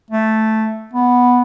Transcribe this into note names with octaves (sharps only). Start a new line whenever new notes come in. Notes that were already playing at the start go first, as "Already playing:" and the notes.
A3
B3